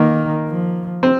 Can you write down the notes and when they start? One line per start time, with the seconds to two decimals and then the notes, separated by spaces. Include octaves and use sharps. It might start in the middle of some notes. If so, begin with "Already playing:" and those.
Already playing: D#3 A#3
0.48 F3
1.03 C4